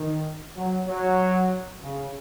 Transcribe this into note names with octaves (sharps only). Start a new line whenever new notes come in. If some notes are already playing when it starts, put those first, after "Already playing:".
Already playing: D#3
F#3
F#3
C#3